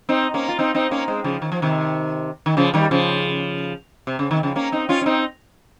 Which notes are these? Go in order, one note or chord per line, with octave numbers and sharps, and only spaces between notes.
C4 D#4
A#3 C#4
F4
C4 D#4
C4 D#4
A#3 C#4
G#3 C4
C#3 F3
D#3
F3
C3 D#3
D#3
C#3 F3
D#3 G3
C#3 F3
C3
C#3
C3 D#3
C#3 F3
A#3 C#4
C4 D#4
C#4 F4
C#4
C4 D#4